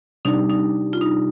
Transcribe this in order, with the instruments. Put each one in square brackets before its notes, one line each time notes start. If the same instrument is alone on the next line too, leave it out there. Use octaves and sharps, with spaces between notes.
[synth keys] C3 G3 D4 G4 [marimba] D#4
[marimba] D#4
F4
D#4